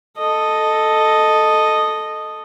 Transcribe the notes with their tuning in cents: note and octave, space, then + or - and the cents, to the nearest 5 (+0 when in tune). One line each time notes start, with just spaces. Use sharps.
A4 +0 D#5 -5